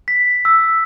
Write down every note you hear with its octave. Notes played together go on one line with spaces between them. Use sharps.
B6
E6